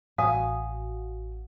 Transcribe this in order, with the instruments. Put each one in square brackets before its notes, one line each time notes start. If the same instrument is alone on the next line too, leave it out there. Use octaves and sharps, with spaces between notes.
[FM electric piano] A1 F#4 [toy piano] F5 D#6 [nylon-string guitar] G#5